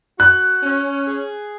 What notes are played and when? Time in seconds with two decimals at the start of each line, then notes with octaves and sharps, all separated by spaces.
0.19 F#4 F#6
0.63 C#4
1.08 G#4